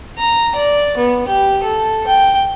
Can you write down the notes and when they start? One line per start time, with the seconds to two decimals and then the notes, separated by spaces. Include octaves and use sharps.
0.18 A#5
0.55 D5
0.97 B3
1.28 G4
1.63 A4
2.07 G5